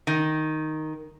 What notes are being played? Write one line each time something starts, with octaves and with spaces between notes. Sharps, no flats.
D#3